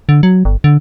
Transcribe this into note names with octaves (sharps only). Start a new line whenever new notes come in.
D3
F#3
G1
D3